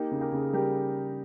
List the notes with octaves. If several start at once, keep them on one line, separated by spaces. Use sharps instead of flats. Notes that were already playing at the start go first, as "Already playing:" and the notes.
Already playing: A#3 D#4 G4
C#3
G#4
G4 A#4
C#3
G3 G4 A#4